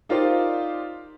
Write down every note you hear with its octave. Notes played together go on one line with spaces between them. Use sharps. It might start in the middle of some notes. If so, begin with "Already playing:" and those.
D#4 F4 G4 A#4 C5 D5